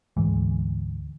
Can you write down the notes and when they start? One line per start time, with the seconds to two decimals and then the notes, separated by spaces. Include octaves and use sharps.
0.17 D2 G#2 E3 G#3